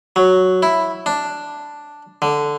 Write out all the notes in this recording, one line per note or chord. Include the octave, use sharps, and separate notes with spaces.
F#3
E4
D4
D3